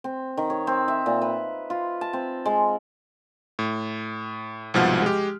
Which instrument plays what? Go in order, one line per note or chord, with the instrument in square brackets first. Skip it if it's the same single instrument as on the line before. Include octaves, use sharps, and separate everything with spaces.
[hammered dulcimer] C4
D#3
C#5
C4
E5
A#2
B4
F4
A5
C4
G#3
[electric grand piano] A2
C2 G#2 B2 F3 F#5 F6
G#3 G4